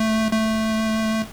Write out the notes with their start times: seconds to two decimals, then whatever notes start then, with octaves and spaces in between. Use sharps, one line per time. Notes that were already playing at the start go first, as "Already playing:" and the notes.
Already playing: A3
0.32 A3